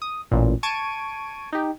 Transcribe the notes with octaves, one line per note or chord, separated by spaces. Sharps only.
D#6
A1 A#2
A5 C#6 G#6 D7 D#7
D#4 G4